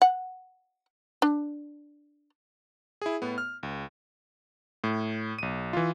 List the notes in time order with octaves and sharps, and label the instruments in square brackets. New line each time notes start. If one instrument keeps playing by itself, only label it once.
[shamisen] F#5
D4
[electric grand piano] E4 G#4
A2 B3
F6
C#2
A2
B1 D#7
E3 F4